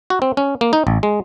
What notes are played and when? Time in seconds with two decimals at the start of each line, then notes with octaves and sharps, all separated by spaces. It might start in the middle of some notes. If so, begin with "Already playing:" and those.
0.10 F#4
0.22 C4
0.37 C#4
0.61 A#3
0.73 D#4
0.87 A1
1.03 G#3